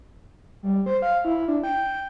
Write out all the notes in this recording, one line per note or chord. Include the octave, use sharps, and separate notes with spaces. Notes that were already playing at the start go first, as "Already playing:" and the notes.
G3
C5
F5
E4
D4
G5